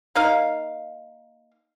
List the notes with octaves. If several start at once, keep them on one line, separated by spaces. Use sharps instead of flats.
A#3 D#4 F5